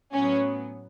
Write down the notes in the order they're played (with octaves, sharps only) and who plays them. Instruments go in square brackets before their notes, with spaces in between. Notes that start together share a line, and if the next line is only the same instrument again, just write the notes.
[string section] A2 F#3 B3 C#4